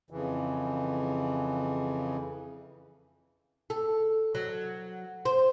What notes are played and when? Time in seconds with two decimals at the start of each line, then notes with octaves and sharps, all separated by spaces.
0.11 F2 C#3 E3
3.70 A4
4.35 F#3
5.25 C5